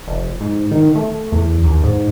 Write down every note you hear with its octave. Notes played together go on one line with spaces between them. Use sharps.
F1
G#2
D#3
A3
E2
D#2
G#2